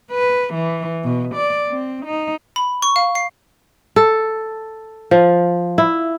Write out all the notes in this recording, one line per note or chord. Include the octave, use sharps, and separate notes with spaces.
B4
E3
B2
D5
C4
D#4
B5
C#6
F5
C7
A4
F3
E4